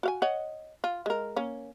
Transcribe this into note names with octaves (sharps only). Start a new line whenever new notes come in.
F#4 F5 G#5
C#5 D#5 F#5
F4
G#3 A#4
A#3 C#4